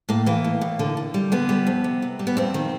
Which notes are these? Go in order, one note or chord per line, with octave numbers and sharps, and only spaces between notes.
A2 A#3
E3 A#3
A2
A2
D3
D3
G3
D3 B3
G3
F2
C3
C3
G3
B3
F2 C4
D#3